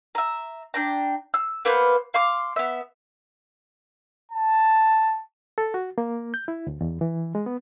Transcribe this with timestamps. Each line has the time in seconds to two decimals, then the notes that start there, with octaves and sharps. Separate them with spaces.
0.15 E5 A#5
0.74 D4 G5 A#5
1.34 E6
1.65 A#3 B3 B4 C5
2.14 F5 C6 D6
2.56 B3 E5
4.31 A5
5.58 A4
5.74 F#4
5.98 A#3
6.34 G6
6.48 E4
6.67 D2
6.81 E2
7.01 E3
7.35 G#3
7.46 B3